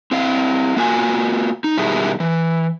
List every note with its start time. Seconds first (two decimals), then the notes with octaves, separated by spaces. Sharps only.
0.11 C4 E4 F5
0.77 A#3 F4 F#4 G#5
1.64 D#4
1.77 B2 D#3 G3 E4 G#4
2.20 E3